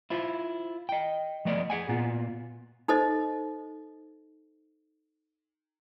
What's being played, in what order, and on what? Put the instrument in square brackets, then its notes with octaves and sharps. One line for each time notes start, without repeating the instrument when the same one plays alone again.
[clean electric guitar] E4 F4 C5
D#5 G5
F3 A3 B3 D5 D#5
G#4 F#5 G#5
A#2 B3 F4
[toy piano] D#4 A4 C5 D#5